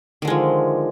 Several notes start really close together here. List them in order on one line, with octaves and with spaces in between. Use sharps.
D#3 D3 G#3 F3